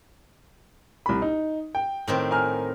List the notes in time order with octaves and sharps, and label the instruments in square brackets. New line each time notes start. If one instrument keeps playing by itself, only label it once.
[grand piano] C2 B5
D#4
G5
[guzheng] A2 D#3 C4
[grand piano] G#5 A#5 F6